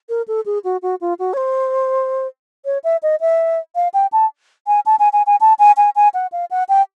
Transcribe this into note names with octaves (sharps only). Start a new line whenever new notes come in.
A#4
A4
G#4
F#4
F#4
F4
F#4
C#5
C5
C#5
E5
D#5
E5
F5
G5
A5
G#5
A5
G#5
G#5
G#5
A5
G#5
G#5
G#5
F#5
F5
F#5
G5